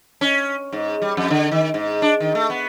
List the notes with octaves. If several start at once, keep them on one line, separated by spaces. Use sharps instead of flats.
C#4
G#2
G3
F2
D3
D#3
G#2
D4
D#3
A3
B3